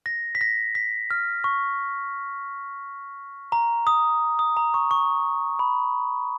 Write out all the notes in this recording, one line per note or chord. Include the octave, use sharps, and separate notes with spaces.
A#6
B6
A#6
B6
F6
C#6
A#5
D#6
D#6
A#5
C#6
C#6
B5